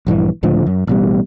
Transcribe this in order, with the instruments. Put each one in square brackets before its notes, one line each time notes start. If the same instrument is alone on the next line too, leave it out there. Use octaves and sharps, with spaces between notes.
[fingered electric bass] A#1 G2 D3 E3
C#2 A2 D3 F3
F#2
A1 B2 G3